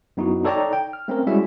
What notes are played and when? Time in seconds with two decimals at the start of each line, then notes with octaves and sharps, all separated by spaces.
0.17 F#2 B3 D#4 E4 F#4
0.44 D#4 A4 C#5 D5 G5 A#5
0.73 G5
0.93 F6
1.08 A3 C4 C#4 A#4
1.27 G3 G#3 C#4 E4 F#4 E5